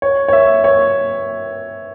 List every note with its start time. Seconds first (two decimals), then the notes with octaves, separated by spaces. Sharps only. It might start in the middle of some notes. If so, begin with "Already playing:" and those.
0.02 C#5
0.28 C#5
0.33 E5
0.64 C#5